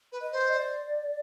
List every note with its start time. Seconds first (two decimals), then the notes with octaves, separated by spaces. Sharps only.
0.12 B4
0.21 D#5
0.32 C5
0.53 D5